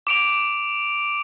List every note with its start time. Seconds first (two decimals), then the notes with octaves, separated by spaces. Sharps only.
0.07 D6 D7 F7